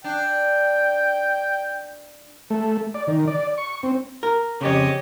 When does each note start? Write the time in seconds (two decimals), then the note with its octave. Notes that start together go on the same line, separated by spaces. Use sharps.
0.04 D4 G5
2.50 A3
2.94 D5
3.07 D#3
3.27 D5
3.58 C#6
3.83 C4
4.23 A#4
4.61 F2 C#3 G4 C#5 D#5